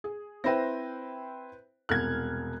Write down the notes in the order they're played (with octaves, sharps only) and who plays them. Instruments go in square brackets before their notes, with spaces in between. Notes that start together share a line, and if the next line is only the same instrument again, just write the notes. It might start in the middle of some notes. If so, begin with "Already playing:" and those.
[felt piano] G#4
[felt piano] C4 E4 G5 [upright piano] B4 C5 A#6
[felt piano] E1 C2 F6 [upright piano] F#6 G#6